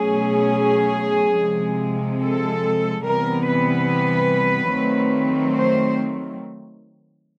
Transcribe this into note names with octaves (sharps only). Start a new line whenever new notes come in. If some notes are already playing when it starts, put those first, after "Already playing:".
Already playing: B2 F#3 A3 C#4 G#4
C3 F3 G#3
A4
C3 E3 G3 B3 A#4
B4
D#3 F#3 A3 C4
C5